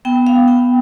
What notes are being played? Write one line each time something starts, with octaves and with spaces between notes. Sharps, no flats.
B3 G5
F5
B3 G5